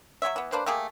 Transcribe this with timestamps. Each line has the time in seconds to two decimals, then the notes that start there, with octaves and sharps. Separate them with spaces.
0.22 F#3 C4 C#5 E5
0.36 E3 B3
0.52 A#3 D4 B4 C5
0.66 A3 A#3 G4 G#4